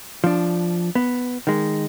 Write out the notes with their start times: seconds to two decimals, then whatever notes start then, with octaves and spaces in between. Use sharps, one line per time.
0.24 F3 D4
0.95 B3
1.47 D#3 G#3